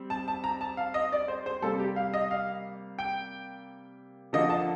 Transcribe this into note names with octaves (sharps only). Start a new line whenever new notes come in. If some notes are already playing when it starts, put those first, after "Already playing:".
Already playing: G3 C4
A5
A5
A#5
A5
F5
D#5
D5
C5
C5
C3 G3 A#3 A4
G4
F5
D#5
F5
G5
D3 F3 A#3 D#5
A5